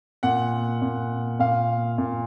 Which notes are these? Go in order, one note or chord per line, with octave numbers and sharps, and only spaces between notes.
A#2 F#5
A#2
A#2 F5
A#2